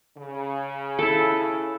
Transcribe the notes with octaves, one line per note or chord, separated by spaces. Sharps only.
C#3
E4 A4